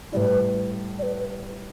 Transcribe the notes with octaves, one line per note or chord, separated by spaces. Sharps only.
A2 G3 E4 B4 D5
D5
B4